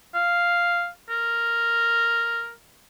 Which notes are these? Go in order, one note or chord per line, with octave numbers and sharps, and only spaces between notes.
F5
A#4